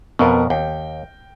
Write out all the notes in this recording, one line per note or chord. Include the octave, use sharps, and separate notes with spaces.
F2 B2 B3 A#4
D#2 G5